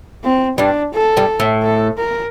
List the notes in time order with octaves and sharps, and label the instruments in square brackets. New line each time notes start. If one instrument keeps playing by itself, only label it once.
[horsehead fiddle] C4
[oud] G2 G3 [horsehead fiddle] D4
[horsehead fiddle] A4
[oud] G2 G3
A2 A3
[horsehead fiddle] A4
A#4